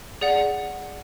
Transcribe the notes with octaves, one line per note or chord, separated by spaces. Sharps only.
G#4 D5 F#5